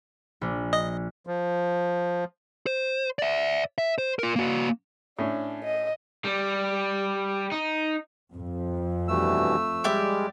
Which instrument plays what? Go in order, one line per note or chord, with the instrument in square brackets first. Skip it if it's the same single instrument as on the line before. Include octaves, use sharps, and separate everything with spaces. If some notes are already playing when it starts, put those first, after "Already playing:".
[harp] A#1
[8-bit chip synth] D#5
[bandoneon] F3
[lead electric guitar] C5
D5 E5
E5
C5
F4 A#4
A#3 F#4
[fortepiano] A2 C#4 [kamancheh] D4
[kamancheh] D#5
[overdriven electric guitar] G3
D#4
[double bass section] F2
[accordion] G2 B2 E3 [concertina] A3 E6
[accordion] G3 G#3 [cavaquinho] G4 D5 E5